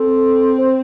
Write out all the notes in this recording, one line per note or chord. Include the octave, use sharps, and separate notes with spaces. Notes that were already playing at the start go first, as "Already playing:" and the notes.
Already playing: C4 A4
C5